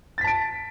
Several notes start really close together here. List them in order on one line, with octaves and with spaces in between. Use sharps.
A6 B6 A5 D7